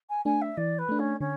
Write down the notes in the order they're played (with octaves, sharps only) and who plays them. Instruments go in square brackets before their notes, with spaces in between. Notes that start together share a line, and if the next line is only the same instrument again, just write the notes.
[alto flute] G#5
[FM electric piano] A3 D4 [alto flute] G#5
[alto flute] E5
[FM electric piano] E3 [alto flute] D5
[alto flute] B4
[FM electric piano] A3 D4
[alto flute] C#4
[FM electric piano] D3 [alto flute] C#4